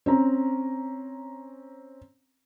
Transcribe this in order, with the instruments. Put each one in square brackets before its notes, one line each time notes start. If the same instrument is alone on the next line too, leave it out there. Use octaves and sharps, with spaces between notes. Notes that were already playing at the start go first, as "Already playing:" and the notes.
[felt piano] C4 C#4 A#5